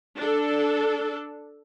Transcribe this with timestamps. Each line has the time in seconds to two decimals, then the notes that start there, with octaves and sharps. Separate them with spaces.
0.17 D4 A4